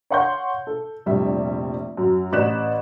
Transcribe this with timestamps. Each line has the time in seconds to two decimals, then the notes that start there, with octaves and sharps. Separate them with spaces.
0.11 C#5 F5 F#5 C6 C#6 G6
0.67 A4
1.06 F1 A#1 G3 E5
1.97 F#2
2.32 A1 D5 F#6 B6 E7